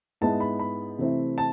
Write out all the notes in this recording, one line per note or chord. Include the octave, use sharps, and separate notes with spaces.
G#2 G#3 B3 E4 A5
B5
B5
C3 E3 A3 C4 E4
A5